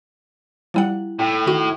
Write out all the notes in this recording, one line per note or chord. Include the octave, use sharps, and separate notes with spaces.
F3 G3 E4 F#5
A2 G5
D#3 F#4